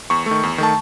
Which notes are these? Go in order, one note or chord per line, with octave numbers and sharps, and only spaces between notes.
E2 C#6
A3
D#3
E2
D#3 A3 A5